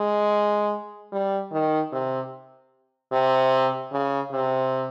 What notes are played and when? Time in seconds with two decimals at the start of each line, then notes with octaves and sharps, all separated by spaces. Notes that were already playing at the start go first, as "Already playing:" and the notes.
Already playing: G#3
1.12 G3
1.52 D#3
1.93 C3
3.13 C3
3.92 C#3
4.32 C3